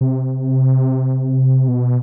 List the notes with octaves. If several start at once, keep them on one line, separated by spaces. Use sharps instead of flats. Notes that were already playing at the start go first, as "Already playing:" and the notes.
C3
B2